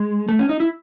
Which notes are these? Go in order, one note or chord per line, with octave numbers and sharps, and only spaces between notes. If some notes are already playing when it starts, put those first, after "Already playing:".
Already playing: G#3
A3
C#4
D#4
E4